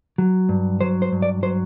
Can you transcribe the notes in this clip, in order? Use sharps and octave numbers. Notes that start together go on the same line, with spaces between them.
F#3
G2
F#3 C5
C5
G2
D5
F#3 C5